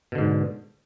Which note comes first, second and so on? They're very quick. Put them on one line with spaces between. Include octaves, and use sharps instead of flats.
B2 D3 G#2